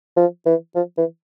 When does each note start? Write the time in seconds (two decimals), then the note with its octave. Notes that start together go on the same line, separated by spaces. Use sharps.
0.17 F3
0.46 E3
0.75 F3
0.97 E3